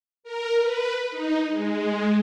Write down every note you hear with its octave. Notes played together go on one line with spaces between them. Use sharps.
A#4
B4
D#4
G#3